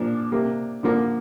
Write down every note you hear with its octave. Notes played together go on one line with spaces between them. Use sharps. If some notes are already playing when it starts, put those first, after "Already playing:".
Already playing: A#2 F3 A#3 D4
C3 A#3
D3 F3 A#3